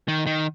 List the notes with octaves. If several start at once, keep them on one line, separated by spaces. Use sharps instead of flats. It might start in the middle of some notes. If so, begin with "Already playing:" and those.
D#3
D#3